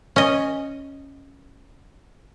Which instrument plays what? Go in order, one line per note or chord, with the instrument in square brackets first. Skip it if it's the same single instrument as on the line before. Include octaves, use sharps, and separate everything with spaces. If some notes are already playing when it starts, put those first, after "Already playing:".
[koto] C#4 D#5